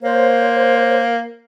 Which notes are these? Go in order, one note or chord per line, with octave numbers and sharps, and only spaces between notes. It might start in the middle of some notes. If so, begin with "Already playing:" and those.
A#3 C5 C#5